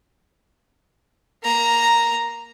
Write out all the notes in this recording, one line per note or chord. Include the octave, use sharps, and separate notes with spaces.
A#3 A#5